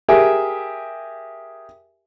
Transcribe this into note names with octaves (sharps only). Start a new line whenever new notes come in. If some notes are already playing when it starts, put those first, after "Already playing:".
G4 G#4 A#4 E5 G#5